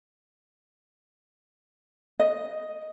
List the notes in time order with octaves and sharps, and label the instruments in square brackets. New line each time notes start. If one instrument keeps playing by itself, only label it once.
[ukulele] D#5